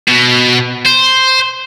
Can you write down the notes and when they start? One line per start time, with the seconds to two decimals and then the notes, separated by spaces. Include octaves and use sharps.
0.08 B2
0.85 C5